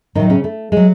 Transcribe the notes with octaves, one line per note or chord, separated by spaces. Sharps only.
A2 D#3 F#3 D#4
C#3 C#4
A3
F#3 G#3